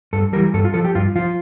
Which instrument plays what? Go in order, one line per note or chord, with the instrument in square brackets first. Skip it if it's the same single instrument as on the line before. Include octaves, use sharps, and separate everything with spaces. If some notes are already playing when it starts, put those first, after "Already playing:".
[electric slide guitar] G2 A4
E3 G3 A#4
G2 A4
F4
F3 A4
G4
G2 F4
F3 F4